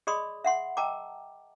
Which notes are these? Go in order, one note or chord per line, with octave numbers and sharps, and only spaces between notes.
G#4 D5 D#5 B5 C6 D#6
E5 F#5 C6
A#4 D#5 G5 A5 A#5 D6